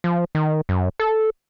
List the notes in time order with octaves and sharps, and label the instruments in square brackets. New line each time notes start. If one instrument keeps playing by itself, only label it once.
[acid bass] F3
D#3
F#2
A4